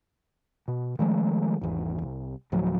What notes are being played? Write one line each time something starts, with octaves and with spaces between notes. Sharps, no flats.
B2
D#3 F3 G#3 A3
G#1 E2
C2
D2 A2 F3 F#3